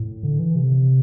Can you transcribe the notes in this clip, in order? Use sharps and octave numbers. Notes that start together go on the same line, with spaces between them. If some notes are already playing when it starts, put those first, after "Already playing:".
Already playing: A2
D3
E3
C3